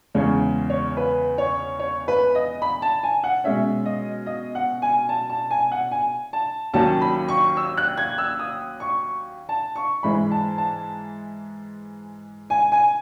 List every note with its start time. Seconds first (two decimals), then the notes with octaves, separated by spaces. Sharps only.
0.15 E2 C#3 G#3 C#4 C#5
0.70 C#5
0.97 B4
1.38 C#5
1.79 C#5
2.08 B4
2.35 D#5
2.62 B5
2.82 A5
3.03 G#5
3.24 F#5
3.44 B2 G#3 C#4 E5
3.86 D#5
4.26 D#5
4.55 F#5
4.82 G#5
5.09 A5
5.30 A5
5.51 G#5
5.72 F#5
5.91 G#5
6.33 A5
6.74 D#2 D#3 F#3 C#4 A5
7.01 B5
7.28 C#6
7.57 E6
7.77 F#6
7.98 G#6
8.18 E6
8.39 D#6
8.80 C#6
9.49 A5
9.76 C#6
10.03 G#2 E3 G#3 B5
10.31 A5
10.58 A5
12.50 G#5
12.72 G#5